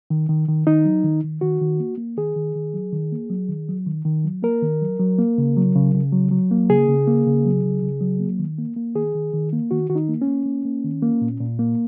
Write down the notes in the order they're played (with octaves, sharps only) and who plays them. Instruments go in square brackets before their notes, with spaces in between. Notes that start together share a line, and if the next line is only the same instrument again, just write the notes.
[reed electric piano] D#3
D#3
D#3
D#3 D#4
F#3
D#3
D#3
D#3 F#4
D#3
A#3
A#3
D#3 G#4
D#3
D#3
F#3
D#3
A#3
F#3
D#3
F#3
D#3
D#3
F#3
A#3 A#4
D#3
F#3
F#3
A#3
C#3
F#3
C#3
C#3
F#3
F#3
A#3
C#3 G#4
C#3
A#3
C#3
F#3
C#3
C#3
F#3
A#3
D#3
A#3
A#3
D#3 G#4
D#3
D#3
A#3
D#3 F#4
D#3 F#4
D#4
A#3
C#4
A#3
A#3
A#3
D#3
A#3
A#2
A#2
A#3